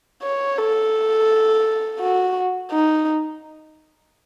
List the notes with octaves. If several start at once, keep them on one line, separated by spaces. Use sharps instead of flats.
C#5
A4
F#4
D#4